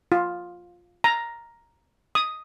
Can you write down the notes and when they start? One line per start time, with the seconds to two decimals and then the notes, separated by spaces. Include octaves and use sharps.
0.12 F4
1.04 A#5
2.15 D#6